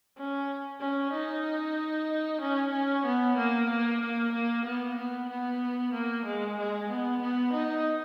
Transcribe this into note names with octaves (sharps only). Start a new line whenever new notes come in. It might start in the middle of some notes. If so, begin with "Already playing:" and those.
C#4
C#4
D#4
C#4
C#4
B3
A#3
A#3
A#3
A#3
B3
B3
B3
A#3
G#3
G#3
B3
B3
D#4